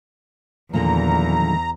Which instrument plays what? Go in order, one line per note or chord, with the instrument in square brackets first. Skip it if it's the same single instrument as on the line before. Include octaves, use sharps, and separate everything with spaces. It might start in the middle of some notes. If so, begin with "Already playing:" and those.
[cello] E2 [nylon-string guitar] A#2 D3 [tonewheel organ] D#3 F3 F#3 [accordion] A#5